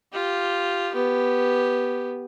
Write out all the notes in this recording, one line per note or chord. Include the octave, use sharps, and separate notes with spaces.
F4 G4
B3 G4